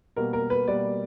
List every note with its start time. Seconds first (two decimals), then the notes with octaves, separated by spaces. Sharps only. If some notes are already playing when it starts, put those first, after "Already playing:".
0.16 B2 G3 A#3 A#4
0.33 A#4
0.50 B4
0.68 B2 G3 A#3 D5